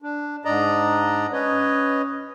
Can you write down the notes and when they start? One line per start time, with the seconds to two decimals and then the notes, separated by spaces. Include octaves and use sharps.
0.02 D4
0.45 G#2 D4 D5 D#5 A#5
1.33 C#4 B4 C#5 D#5